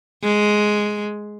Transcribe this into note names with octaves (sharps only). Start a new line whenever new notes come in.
G#3